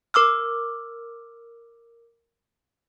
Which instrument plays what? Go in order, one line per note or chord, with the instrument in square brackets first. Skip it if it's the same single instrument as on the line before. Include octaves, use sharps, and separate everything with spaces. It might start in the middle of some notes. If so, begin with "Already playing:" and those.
[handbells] A#4 D6 E6 F6